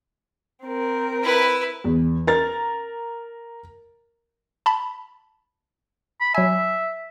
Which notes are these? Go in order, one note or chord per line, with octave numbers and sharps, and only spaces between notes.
C4 A#4
E4 B4
E2
A#4 A#5 A6
A5 B5
B5
F#3 E5 G#5